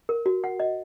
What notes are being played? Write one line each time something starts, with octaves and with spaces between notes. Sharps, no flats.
A#4
F#4
F#5
D#5